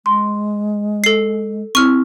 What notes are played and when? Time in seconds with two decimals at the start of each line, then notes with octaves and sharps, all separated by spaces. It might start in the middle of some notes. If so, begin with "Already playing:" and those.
0.06 G#3 C6
1.04 A4 C7
1.75 C4 E4 C#6 F6